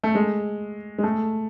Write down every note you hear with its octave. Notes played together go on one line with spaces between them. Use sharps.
A3
G#3
G#3
A3